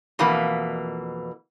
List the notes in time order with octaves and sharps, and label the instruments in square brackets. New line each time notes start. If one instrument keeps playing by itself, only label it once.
[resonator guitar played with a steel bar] F2 B2 E3 A#3